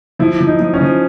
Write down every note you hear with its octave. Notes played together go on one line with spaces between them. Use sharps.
F3 E4
F3
D#4
F3
C#4
F3